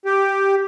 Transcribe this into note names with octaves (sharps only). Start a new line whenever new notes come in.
G4